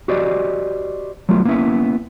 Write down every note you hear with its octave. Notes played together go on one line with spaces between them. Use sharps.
F#4 G4 C5 D5 D#5
F#3 G3 A3 B3 F4
A#3 B3 C#4 E4 E5